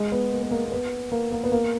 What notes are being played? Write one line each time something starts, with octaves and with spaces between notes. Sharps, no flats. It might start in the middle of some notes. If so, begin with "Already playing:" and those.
Already playing: G#3
B3
A#3
B3
A#3
A#3
B3
A#3
A#3
B3
A#3